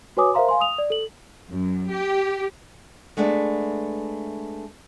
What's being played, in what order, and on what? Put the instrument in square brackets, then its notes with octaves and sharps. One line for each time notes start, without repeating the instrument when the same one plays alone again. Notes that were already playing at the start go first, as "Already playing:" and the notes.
[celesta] F#4 B4 C#5 G#5 D6 D#6
A#4 C5 E5 F5 A#5 C6
F5 G#5 C6
D#6 F7
D5
A4 F#7
[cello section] F#2
G4
[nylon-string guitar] G#3 A3 B3 D4